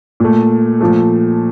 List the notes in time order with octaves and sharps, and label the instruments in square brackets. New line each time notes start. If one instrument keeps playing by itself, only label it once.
[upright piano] A#2 A3
A#2 F3 A3